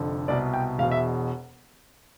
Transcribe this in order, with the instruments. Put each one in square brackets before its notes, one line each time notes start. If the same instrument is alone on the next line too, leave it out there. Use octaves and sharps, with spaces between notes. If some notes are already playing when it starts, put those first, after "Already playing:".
Already playing: [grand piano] F1 F2 D3
C2 B2 D5
G5
E1 E2 B2 F5
E5